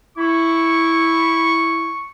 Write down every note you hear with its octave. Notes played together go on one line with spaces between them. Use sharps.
E4 C#6